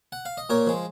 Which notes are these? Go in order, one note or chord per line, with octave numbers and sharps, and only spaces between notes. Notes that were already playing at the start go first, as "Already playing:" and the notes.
F#5
F5
D#5
A#2 A#4 C#5
F3 G#3